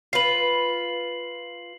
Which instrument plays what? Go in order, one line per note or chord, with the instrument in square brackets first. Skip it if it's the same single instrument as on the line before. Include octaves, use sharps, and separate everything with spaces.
[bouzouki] F4 B4 [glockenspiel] C7 F#7